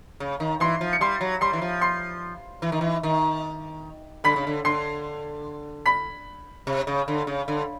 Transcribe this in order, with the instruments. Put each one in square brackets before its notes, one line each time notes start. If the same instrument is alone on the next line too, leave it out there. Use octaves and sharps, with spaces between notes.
[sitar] C#3
D#3
[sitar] E3 [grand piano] C6 C7
[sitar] F3
[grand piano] C#7
[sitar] G3 [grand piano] C6 C7
[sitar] F#3
[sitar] G3 [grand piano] C6 C7
[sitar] E3
F3
[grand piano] C6 C7
[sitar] E3
D#3
E3
D#3
[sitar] D3 [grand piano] B5 B6
[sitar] C#3
D3
[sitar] D3 [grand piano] C6 C7
[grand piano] B5 B6
[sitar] C3
C#3
D3
C#3
D3